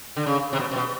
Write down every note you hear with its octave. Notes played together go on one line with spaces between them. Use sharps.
D3
C#3
C3
B2
C3
B2